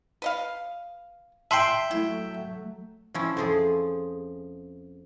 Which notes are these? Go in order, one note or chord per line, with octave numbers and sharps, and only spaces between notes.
B4 D#5 F5
E5 G5 A5 C6 C7
F#3 A3 E4
F3 C#4 E4
F2 F3 G#4